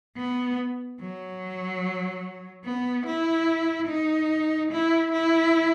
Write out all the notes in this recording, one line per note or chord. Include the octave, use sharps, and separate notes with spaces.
B3
F#3
B3
E4
D#4
E4
E4